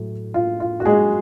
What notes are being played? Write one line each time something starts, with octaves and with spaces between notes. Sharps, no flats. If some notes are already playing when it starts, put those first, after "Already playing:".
Already playing: A2 F#3 A3
F4
F4
F#4
G#3 G#4